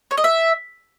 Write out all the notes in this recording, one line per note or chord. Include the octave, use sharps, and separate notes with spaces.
C#5
D#5
E5